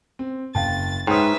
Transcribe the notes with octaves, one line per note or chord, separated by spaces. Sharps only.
C4
F#1 F5 G5 A5 A6
G#2 B4 C#5 E5 G5 D#6 F6